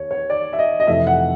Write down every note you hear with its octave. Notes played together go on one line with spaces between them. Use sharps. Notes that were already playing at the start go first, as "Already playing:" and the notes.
Already playing: D#2 C#5
C#5
D5
E5
D#5
D#5
F2 C3 E3 A3 E5
F#5